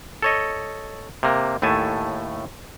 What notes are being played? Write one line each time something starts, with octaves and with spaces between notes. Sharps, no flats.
A4 C#5 D#5
C3 A#3
D#2 A2 A3 G#5 A5